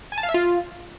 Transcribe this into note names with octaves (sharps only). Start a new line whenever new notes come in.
G#5
A5
F5
E5
F4